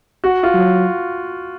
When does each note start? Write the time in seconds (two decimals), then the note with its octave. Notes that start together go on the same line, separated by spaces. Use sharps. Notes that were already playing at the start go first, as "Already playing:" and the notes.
0.24 F#4
0.43 F4
0.54 F#3